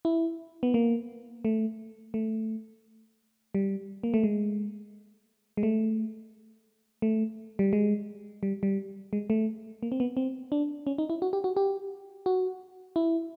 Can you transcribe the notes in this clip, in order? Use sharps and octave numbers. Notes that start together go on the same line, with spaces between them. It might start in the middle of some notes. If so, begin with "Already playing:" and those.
E4
B3
A#3
A3
A3
G3
A#3
A3
G#3
G#3
A3
A3
G3
G#3
G3
G3
G#3
A3
A#3
C4
B3
C4
D4
C#4
D#4
E4
F#4
G4
F#4
G4
F#4
E4